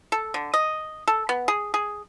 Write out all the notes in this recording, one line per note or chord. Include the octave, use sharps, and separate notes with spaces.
A4
D3
D#5
A4
B3
G#4
G#4